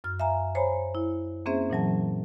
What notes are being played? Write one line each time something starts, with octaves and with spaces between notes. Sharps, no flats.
F#2 F6
E5 F5 G#5 A#5
C5 C#5 G#5 A#5 B5
E4
A#3 C4 C#4 G#4 C5 E5
A#2 E3 F#3 A5